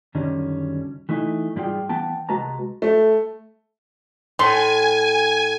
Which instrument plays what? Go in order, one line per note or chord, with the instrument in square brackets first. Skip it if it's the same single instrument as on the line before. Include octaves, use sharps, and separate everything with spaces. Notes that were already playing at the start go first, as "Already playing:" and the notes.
[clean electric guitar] C#2 F#2 D3 D#3 G3 C#4
E3 A3 D#4 E4
G#2 G3 E4 F4 G#4 G5
E3 B3 G5 A5
C2 G#3 F#4 B4 A5 A#5
[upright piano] A3
[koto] A2 [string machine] G#5 [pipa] C6